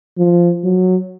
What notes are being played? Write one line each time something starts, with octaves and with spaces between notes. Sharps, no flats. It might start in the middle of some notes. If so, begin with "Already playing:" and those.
F3
F#3